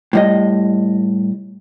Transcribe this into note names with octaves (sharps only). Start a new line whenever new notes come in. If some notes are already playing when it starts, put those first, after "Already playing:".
A2 G3 D#5